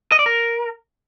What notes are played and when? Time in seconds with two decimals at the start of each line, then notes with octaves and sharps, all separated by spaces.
0.12 D#5
0.19 D5
0.26 A#4